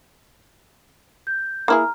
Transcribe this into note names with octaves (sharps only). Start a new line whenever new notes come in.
G6
A#3 E4 G#4 A#5 F6